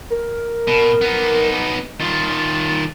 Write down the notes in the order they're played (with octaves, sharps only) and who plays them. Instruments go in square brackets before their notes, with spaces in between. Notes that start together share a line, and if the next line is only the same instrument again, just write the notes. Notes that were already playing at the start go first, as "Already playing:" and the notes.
[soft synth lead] A#4
[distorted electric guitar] B2
B3 D#4
[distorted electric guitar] D#3 F4 [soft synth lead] A6